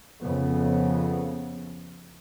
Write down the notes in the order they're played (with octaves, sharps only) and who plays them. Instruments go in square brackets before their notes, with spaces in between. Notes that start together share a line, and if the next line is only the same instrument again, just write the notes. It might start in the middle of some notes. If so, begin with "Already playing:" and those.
[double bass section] F2 C#3 B3